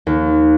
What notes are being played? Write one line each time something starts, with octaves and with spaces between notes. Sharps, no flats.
D#2